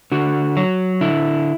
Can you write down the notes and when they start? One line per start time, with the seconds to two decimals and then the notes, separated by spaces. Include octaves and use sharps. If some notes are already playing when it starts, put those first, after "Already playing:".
0.12 D3 F#4
0.57 F#3
1.01 D3 E4